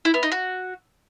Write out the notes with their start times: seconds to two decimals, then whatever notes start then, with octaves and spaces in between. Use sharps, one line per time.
0.05 E4
0.14 B3
0.23 D#4
0.32 F#4